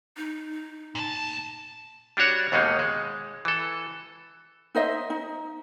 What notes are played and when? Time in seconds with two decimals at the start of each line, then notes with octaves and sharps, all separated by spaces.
0.17 D#4
0.95 A#2 A5
2.17 G3 D4 F#4 C#5 F#5
2.52 D#2 B2 G#3 A#3 D#4
2.79 G#3
3.45 E3 A4
4.75 D#4 C5 D#5 E5
5.10 D#4